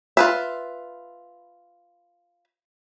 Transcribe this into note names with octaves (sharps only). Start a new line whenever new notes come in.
F4 B4 E5